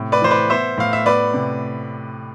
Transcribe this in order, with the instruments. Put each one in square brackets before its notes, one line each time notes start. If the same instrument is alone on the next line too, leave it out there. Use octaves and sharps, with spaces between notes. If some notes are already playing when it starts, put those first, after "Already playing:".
Already playing: [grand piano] A2 C3
B4 D5
E3 C5
B4 D5
B3 C5 E5
A2 F5
E5
B3 B4 D5
C3